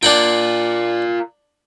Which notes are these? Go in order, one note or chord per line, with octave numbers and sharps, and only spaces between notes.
D4 F4 A#4 F#5 G5